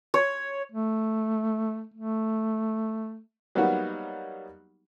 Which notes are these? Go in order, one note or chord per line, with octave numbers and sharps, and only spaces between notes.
C#5
A3
A3
F#3 G3 A#3 B3 D#4 F#4